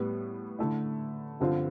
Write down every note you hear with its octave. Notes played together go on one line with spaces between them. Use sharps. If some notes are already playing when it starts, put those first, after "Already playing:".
Already playing: A2 G3 B3
D3 A3 E4
G2 D3 F3 C4 F4